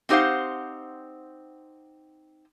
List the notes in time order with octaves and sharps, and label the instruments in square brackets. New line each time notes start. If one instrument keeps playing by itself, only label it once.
[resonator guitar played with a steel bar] C4 D#4 G4 C5 F5 F#5